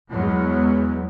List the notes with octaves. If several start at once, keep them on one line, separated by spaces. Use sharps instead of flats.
E2 F#3 G#3 B3